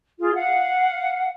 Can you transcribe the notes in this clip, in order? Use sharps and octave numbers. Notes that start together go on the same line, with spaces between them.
F4 G#4
F5 F#5